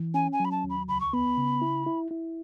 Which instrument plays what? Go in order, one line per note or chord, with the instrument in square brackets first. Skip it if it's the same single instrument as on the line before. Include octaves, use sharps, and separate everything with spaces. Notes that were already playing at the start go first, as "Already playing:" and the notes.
Already playing: [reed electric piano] E3
[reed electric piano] C#4 [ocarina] G#5
[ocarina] G#5
[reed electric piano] F#3
[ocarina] B5
A5
[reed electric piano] D#2
[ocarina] B5
[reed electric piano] C#2 [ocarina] B5
[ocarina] C#6
[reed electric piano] B3 [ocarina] B5
[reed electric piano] C#3
E4
E4
E4